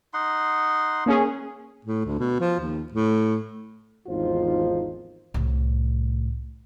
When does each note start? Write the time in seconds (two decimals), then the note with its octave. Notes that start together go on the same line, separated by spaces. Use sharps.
0.14 D#4 F#5 C6
1.06 A#3 C#4 G#4
1.85 A2
2.06 D2
2.19 B2
2.40 F3
2.60 D#2
2.92 A2
4.07 G#1 E2 F3 D#4 F4 C5
5.34 C2 A2